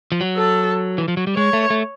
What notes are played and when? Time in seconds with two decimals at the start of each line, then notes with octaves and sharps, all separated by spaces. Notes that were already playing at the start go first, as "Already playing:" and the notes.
0.12 F3
0.21 F#3
0.36 A4
0.98 E3
1.08 F3
1.17 F#3
1.27 G3
1.36 G#3 C#5
1.53 A3
1.70 A3